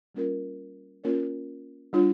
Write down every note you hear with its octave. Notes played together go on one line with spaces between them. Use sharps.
G3 A#3 C#4 F4 A#4
A#3 C#4 F4 A#4 C#5
G3 D4 F4 C#5